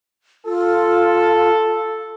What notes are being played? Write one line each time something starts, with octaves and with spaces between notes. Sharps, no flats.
F4 A4